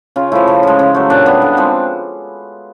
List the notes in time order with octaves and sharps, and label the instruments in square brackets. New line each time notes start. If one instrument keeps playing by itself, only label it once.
[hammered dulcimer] C#3 F4
F3 A3 E4
C#3
F3 G#3
C#3
F#3 A3
A#2 D4
G3 B3
D3
F3 G#3 C4